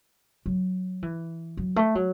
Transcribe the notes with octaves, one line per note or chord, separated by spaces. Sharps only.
F#3
E3
F#3
A3
F#3